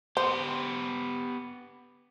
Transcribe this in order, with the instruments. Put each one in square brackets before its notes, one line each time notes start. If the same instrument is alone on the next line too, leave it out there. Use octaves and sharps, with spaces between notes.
[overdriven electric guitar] B3 G4 [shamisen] C5